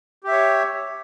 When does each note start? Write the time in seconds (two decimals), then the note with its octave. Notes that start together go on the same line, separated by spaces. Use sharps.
0.24 G4
0.28 E5
0.32 C#5